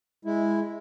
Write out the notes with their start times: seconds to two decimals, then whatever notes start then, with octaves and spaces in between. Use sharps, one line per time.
0.25 G#3 E4